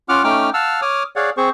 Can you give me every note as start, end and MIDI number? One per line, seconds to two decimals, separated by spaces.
0.09 0.24 61
0.09 0.24 65
0.09 0.24 78
0.09 0.24 86
0.09 0.24 89
0.24 0.50 57
0.24 0.50 61
0.24 0.50 63
0.24 0.50 79
0.24 0.50 86
0.24 0.50 89
0.54 0.81 77
0.54 0.81 78
0.54 0.81 81
0.54 0.81 88
0.54 0.81 89
0.82 1.03 73
0.82 1.03 86
0.82 1.03 87
0.82 1.03 89
1.16 1.30 68
1.16 1.30 73
1.16 1.30 74
1.16 1.30 77
1.16 1.30 78
1.37 1.49 60
1.37 1.49 68
1.37 1.49 72
1.37 1.49 85